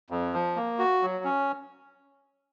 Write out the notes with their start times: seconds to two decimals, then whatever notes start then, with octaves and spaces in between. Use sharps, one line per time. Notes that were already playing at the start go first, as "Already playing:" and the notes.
0.10 F2
0.34 F3
0.56 A#3
0.79 F#4
1.02 F#3
1.24 C#4